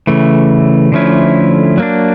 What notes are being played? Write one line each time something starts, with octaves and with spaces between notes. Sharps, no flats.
C#3 E3 A3
D3 F3 A3 C#4 E4
F#3 A#3 D4